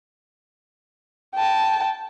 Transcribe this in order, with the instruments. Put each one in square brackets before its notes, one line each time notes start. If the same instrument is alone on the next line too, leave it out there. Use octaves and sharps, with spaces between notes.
[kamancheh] G5 A5